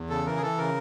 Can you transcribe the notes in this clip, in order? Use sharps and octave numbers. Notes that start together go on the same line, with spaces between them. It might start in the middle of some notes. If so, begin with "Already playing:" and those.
Already playing: E2
C#3 A4
E3 A#4
G#4
E3 A4
C#3 A#4